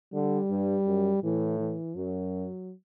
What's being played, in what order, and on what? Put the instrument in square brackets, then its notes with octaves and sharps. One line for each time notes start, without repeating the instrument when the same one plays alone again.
[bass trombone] D3 [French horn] G3
[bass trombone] G2
F#2
[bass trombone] A2 [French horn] E3
[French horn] E3
[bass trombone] F#2 [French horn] F#3